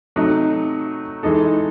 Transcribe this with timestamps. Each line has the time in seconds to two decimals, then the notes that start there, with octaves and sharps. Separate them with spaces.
0.16 C3 F#3 A3 D#4
1.23 E3 G#3 D#4 A4